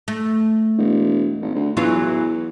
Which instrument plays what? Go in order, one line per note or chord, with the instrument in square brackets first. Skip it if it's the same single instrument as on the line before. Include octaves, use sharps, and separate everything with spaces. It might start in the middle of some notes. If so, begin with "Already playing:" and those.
[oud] A3
[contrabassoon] E1
G#1
D2
[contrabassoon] E2 [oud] E3 F#3 F4